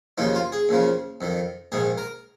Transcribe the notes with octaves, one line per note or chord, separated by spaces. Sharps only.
D#2 C#3 F3 D#4
F4
G#4
D#2 C#3 F3
F2 D#3
A#1 G#2 D#3 G#4
A#4